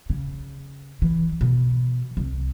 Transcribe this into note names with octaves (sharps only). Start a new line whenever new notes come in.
C#3
E3
B2
C2